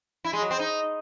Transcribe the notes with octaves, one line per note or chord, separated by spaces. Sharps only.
E4
G#3
F#3
C4
D#4